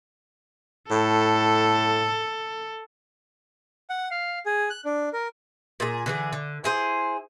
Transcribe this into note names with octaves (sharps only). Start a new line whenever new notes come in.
A2 A4
F#5
F5
G#4
F#6
D4
A#4
A#2 G#4
D3 E3 G#4
D3
E4 G#4 C5